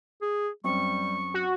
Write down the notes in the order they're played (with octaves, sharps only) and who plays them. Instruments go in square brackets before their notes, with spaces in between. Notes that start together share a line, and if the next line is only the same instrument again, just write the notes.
[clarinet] G#4
[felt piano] F#2 C4 [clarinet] G3 [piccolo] C#6
[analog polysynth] F#4